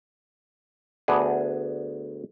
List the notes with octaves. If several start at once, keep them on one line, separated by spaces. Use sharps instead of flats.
D2 B3 D4 G#4